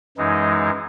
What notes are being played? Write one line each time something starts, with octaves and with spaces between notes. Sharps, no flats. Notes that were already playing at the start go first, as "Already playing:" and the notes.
F#2 E3 G#3 D#4